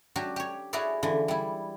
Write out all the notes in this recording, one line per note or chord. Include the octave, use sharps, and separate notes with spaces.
F#3 D4 F#4 G4
G4 C#5
E4 F#4 G#4 C#5 D5 E5
D3 E3 F3
G3 E4